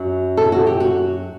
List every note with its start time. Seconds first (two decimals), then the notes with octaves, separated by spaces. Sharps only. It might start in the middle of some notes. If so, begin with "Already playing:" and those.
Already playing: F#2 F#3
0.37 A4
0.52 F#4
0.67 G4
0.80 F#4